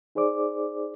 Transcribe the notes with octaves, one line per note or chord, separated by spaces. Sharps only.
D#4 G#4 C5 D5 D6